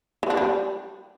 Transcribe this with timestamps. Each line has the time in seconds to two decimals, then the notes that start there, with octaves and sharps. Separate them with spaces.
0.23 E3
0.30 D4
0.37 G3